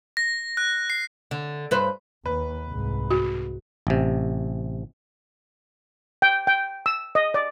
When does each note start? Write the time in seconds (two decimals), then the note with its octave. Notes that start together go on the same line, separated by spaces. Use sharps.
0.17 A#6
0.57 F#6
0.90 C7
1.31 D3
1.71 G2 B4 C5
2.26 D#2 B4
2.68 C2 G#2
3.11 F#4
3.87 A1 C3
6.22 G5
6.47 G5
6.86 E6
7.15 D#5
7.34 D5